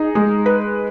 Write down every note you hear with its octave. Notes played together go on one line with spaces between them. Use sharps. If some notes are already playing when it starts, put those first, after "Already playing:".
Already playing: D#4 G#4
G#3
B4